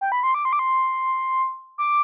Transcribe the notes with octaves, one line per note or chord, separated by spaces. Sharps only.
G5
B5
C6
D6
C6
D6
C6
D6